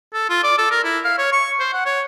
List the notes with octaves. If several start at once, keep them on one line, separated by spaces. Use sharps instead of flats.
A4
F4
D5
A4
A#4
E4
F5
C#5
C#6
C5
F#5
C#5